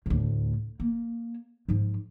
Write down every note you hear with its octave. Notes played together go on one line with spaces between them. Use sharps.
D2 A2
A#3
G#2 F3